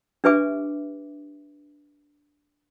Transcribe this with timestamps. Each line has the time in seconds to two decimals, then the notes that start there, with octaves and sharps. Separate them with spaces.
0.24 D4 G4 B4 E5 G#5 D6